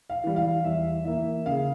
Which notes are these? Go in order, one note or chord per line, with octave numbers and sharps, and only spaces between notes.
F5
E3 G3
F5
E2 E5
E3 A#3 E5
C#3 F5